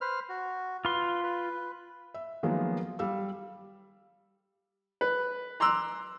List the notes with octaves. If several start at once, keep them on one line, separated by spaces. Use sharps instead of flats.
B4 C5 F6
F#4
F4 B4 C6
B4
E5
D#3 F3 F#3 G#3 A#3 B3
G3 F5 E6
B4
A#5 C6 D6 E6 F#6